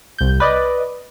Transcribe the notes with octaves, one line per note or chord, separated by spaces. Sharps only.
C2 G6
B4 D5 D#5